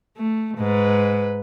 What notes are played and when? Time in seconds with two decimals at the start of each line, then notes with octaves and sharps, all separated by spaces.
0.17 A3
0.57 G#2 B4